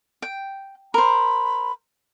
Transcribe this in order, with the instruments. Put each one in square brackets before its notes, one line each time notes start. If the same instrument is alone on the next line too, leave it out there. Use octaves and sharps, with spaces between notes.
[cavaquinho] G5
[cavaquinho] A#4 C5 [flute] B5